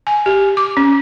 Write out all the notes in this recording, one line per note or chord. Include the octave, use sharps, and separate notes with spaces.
G#5
G4
D6
C#4